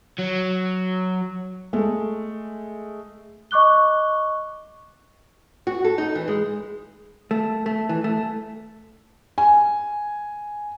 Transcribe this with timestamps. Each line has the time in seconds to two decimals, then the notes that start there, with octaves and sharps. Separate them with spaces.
0.18 F#3
1.73 G#3 A3
3.51 D#5 C#6 D6 F#6 G7
5.67 F#4
5.84 A4
5.98 D#4
6.15 E3
6.28 G#3
7.31 A3
7.66 A3
7.89 E3
8.04 A3
9.38 G#5